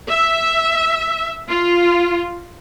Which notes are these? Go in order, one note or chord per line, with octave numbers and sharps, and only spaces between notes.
E5
F4